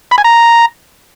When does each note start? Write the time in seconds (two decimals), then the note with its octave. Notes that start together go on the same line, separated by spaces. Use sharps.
0.11 B5
0.18 G#5
0.24 A#5